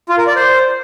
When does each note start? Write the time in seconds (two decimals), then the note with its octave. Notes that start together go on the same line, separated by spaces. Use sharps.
0.09 F4
0.18 A#4
0.27 D5
0.36 C5